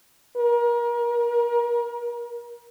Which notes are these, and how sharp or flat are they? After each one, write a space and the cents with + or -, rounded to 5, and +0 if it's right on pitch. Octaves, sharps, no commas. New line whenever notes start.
A#4 +35